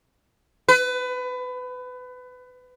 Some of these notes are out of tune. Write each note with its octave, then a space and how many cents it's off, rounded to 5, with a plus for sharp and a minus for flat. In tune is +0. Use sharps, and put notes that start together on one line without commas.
B4 +25